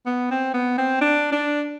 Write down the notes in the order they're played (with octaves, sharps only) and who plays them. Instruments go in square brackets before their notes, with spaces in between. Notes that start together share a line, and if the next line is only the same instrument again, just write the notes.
[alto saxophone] B3
C4
B3
C4
D4
D4